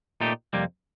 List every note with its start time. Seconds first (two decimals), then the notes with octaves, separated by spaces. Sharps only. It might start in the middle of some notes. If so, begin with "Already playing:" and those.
0.21 A#2 A3 D#4 G4
0.53 F2 C3 G3 A#3